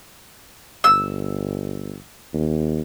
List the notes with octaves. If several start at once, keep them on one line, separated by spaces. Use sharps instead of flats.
G1 E6
D#2